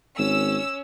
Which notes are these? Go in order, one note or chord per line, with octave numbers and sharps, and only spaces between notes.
G#1 C#4 E6